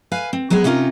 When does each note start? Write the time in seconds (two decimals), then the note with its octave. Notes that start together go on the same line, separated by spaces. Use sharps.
0.12 B4 F5 G#5
0.33 C4
0.50 F#3 G#3 B3 G#4
0.64 C3 C#4 D#4 F4 A#4